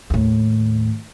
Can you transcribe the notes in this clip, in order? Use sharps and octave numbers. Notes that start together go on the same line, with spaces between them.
D#2 A2